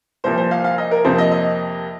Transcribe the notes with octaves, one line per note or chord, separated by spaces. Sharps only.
C2 A#2 F3 C5
C5
F5
F5
D#5
A#4
F2 C3 F3 A#3 C5
D#5
D#5